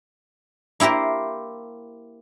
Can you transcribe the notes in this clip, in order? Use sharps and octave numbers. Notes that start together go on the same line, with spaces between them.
A#3 E4 G4 A#4 C5